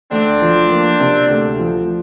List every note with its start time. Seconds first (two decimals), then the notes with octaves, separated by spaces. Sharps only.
0.11 D2 C4 D4
0.41 F3
0.71 A#3
1.00 C3
1.29 D2
1.59 F3